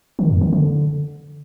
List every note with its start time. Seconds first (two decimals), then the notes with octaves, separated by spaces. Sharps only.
0.19 D#3
0.30 F2
0.41 D#3
0.53 D3